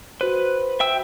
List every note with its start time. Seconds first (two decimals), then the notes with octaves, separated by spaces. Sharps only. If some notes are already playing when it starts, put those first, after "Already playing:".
0.21 F#4 B4 C5
0.80 E5 G5 E6